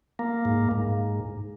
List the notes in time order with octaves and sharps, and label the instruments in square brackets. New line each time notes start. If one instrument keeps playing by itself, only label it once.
[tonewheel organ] A#3
G#2
G#2